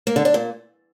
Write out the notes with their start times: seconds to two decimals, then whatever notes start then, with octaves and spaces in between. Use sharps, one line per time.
0.07 A#3
0.16 D3
0.25 D4
0.34 A#2